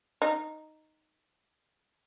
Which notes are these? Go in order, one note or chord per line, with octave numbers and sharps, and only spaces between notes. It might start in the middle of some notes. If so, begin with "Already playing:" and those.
D#4